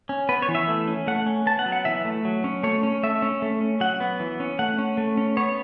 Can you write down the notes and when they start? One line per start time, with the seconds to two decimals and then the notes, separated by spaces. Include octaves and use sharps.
0.09 C#4
0.29 B3 B4
0.42 C#5
0.48 E3
0.55 E5
0.68 A3
0.87 C#4
1.07 A3 F#5
1.26 C#4
1.46 B3 A5
1.59 F#5
1.66 F#3
1.72 F#5
1.85 E3 E5
2.05 A3
2.25 F#3
2.44 C#4
2.63 A3 C#5
2.83 C#4
3.03 A3 E5
3.22 C#4
3.42 A3
3.61 C#4
3.80 F#3 F#5
4.00 B3
4.20 E3
4.40 C#4
4.59 A3 F#5
4.79 C#4
4.97 A3
5.17 C#4
5.37 B3 C#5